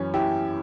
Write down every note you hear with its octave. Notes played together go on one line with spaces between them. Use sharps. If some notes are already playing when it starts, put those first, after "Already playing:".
Already playing: F#2 E3 C#4
E4 G4